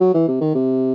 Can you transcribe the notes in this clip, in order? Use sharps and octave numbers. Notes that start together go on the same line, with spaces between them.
F#3
E3
C3
D#3
C3